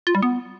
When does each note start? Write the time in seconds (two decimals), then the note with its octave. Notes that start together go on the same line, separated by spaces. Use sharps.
0.07 F4
0.15 G3
0.23 B3